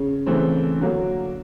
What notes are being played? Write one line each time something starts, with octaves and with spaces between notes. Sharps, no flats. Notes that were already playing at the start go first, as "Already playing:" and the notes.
Already playing: C#3
C#3 E3 A3 C4
D3 F#3 A#3